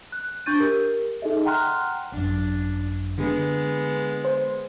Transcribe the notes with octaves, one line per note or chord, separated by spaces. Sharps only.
F#6
D4 C#6 G6 A6 D#7
G4 A#4
D#4 G#4 A4 D#5 E5
F#5 G5 A#5 C6 F6 F#6
G#1 F#2 D4
D3 G#3 B3
C5